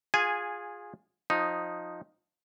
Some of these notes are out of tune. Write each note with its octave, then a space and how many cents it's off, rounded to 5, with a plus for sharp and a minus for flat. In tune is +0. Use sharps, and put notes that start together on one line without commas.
F4 +20 G#4 -10 G#5 +0
F3 +20 D#4 +0